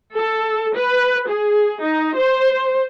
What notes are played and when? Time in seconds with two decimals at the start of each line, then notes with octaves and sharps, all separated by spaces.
0.14 A4
0.74 B4
1.28 G#4
1.81 D#4
2.16 C5